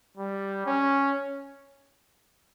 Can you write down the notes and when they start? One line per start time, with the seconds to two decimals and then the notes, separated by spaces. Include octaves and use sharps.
0.17 G3
0.67 C#4